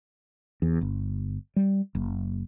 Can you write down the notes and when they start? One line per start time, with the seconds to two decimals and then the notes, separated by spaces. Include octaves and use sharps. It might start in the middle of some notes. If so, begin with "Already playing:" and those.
0.62 E2
0.81 G1
1.56 G3
1.95 F#1